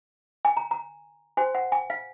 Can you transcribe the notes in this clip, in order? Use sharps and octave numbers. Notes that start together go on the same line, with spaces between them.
G#5
A#5
A#5
F#4 C5 G#5
F#5
G#5
F5